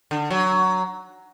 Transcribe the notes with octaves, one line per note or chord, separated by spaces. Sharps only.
D3
F#3